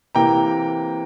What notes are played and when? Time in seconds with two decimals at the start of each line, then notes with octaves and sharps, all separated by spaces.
0.15 C3 E3 A#3 G5 A#5